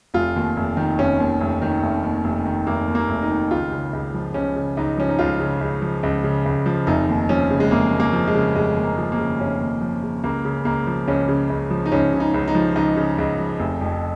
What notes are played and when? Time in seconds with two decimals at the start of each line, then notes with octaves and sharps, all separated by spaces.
0.14 F1 F4
0.36 D#2
0.57 F1
0.77 D#3
0.98 F1 C#4
1.20 D#2
1.41 F1
1.62 D#3
1.83 F1
2.04 D#2
2.24 F1
2.45 D#3
2.67 F1 A#3
2.88 D#2
2.95 A#3
3.09 F1
3.23 D#4
3.30 D#3
3.51 C#2 F4
3.72 C#3
3.93 C#2
4.14 F3
4.34 C#2 C#4
4.56 C#3
4.77 C#2 D#4
4.97 F3 C#4
5.09 D#4
5.19 C#2 F4
5.40 C#3
5.61 C#2
5.82 F3
6.03 C#2
6.24 C#3
6.46 C#2
6.66 F3
6.87 F1 D#4
7.09 D#2
7.29 F3 C#4
7.50 C#3
7.60 G#3
7.71 F1 A#3
7.92 D#2
8.00 A#3
8.13 F3
8.27 G#3
8.35 C#3
8.55 F1 G#3
8.76 D#2
8.84 A#3
8.98 F3
9.12 A#3
9.18 C#3
9.39 F1 C#4
9.61 D#2
9.81 F3
10.03 C#3
10.24 C#2 A#3
10.45 C#3
10.65 C#2 A#3
10.87 F3
11.08 C#2 C#4
11.28 C#3
11.50 C#2
11.70 F3
11.86 D#4
11.92 C#2 C#4
12.13 C#3
12.20 D#4
12.34 C#2
12.48 D#4
12.55 F3
12.76 C#2 D#4
12.97 C#3
13.18 C#2
13.39 F3
13.60 F1
13.81 F2